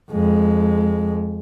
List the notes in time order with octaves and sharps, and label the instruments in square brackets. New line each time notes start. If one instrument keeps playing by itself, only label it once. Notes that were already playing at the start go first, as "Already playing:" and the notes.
[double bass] F2 G#3